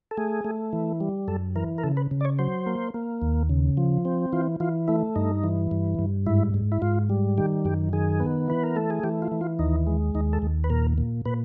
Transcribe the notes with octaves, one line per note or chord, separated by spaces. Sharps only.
A4
A3 G#4
A3
E3
G3
F#2 A4
E3 A#4
A#4
C#3 A4
B4
C#3
D5
C#5
F#3 C5
A#3
A#3
D#2
C#3
F3
C4
E3 F4
E3 F4
A3 E4
G2 D#4
E3
G2
G2
G#2 E4
G#2
E4
G#2 F4
G3
D#3 G4
F#2 G4
D#3 G#4
B3
E3 B4
A#4
A3 A4
G#4
E3 G4
F4
E3
F4
D#2 D#4
G#3
D#2 D#4
A4
D#2
B4
A#2 A#4
A#2
A#2 B4